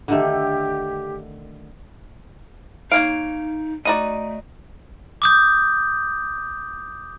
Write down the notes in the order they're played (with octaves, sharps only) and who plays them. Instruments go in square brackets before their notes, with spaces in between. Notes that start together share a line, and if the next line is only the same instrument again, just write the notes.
[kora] D3 D#3 A3 [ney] G4
[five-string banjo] A#3 C#5 F5 [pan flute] D#4 [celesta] D7
[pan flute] A3 [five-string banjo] D#4 F#4 D5 [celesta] A#5 D#7
[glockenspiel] D6 D#6 G6